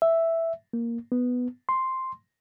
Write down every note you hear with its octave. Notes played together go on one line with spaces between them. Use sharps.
E5
A#3
B3
C6